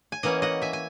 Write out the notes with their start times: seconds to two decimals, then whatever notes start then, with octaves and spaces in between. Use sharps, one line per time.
0.12 G#5
0.23 E3 A#3 C#4 D#5 F#5
0.42 D#5 F#5
0.62 E5 G#5
0.73 G#5